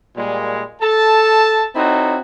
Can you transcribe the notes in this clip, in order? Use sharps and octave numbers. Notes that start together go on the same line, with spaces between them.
A#2 G3 G#3
A4 A5
C4 D#4 E4 F#4 A4 C#5